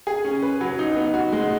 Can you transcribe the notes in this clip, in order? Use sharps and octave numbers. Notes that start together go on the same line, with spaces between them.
G#4
C#4
B4
F#3
D#4
B3
F#4
G#3